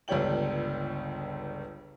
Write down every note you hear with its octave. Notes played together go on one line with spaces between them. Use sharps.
G1 C#2 G3 C#5 G5 F#7